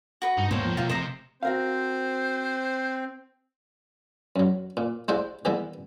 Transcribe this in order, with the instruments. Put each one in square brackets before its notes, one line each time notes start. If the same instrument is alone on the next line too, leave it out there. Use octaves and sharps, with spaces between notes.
[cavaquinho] F#4 B4 D#5
[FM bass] G2 [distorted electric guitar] D#4
[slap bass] D#2 G#2 [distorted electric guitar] A#3 C#5 [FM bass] B3 [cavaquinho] C5 G5
[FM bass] F3
[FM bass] E1 [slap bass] B2 D#3 F3 [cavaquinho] F4 E5 G5
[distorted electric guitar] C3 [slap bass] F3 A3 C4 [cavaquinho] C5 D#5 A#5
[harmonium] C4 [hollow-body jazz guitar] F#4 A#4 F5 [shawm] C5
[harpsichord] F#2 F#3
A#2
G#3 E4 G4 C5 D5 F#5
D#3 E3 G3 G#3 B3 E4